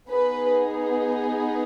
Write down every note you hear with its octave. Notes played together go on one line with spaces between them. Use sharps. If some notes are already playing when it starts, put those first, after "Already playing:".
B3 D#4 G#4 B4